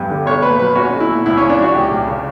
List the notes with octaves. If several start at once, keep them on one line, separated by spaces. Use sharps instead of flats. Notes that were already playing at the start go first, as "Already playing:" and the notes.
Already playing: G2 G3 B3
D3
B1 C#5
A#2 B4
F#3 B4
C#4 F#4
B1
E4
A#2
C#2 E4
C#3 C#4
D4
E3 F#4
C#2 G4
C#2
C#3